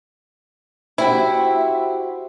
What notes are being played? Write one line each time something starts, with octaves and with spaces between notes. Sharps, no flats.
E4 F#4 G4 C5